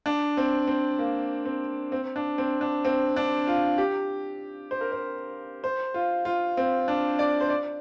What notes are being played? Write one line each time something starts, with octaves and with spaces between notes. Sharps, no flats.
D4
C4
C4
A#3
C4
C4
D4
C4
D4
C4
D4
F4
G4
C5
A#4
C5
C5
F4
F4
C4
D4
D5
C5
D5